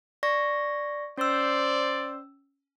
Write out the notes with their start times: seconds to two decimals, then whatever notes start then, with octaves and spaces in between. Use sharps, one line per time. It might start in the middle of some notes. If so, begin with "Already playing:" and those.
0.23 D5 C#6 A#6
1.18 C#4 C5 D5 E6